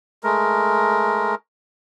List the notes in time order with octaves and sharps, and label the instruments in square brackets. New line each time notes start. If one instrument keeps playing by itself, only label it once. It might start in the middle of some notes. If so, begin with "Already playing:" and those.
[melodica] G#3 A3 A#4